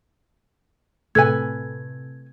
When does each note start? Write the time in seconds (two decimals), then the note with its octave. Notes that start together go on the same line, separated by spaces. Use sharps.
1.15 A2 C3 A3 A4 B4 G#5 G#6